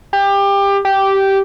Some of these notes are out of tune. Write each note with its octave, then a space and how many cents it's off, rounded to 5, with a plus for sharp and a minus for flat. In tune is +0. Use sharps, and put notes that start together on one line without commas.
G4 +20
G4 -10